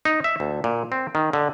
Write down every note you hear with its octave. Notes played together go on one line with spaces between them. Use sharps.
D#4
E5
D2
A#2
C4
D#3
D3